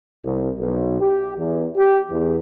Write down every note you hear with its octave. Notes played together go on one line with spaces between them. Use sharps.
C2
B1
G4
E2
G4
E2